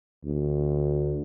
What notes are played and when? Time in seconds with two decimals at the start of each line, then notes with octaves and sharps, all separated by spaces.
0.24 D2